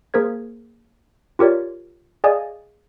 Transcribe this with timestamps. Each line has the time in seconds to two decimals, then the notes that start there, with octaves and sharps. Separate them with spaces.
0.14 A#3 G#4 A#4 C5 G#6
1.39 F4 G4 A#4 C#5 D5
2.24 G#4 D5 D#5 F5 G#5 D#6